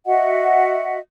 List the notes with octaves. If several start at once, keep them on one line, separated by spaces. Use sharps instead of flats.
F#4 D#5 E5 F#5